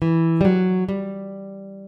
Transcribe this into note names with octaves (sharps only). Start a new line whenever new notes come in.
E3
G3
F#3
G3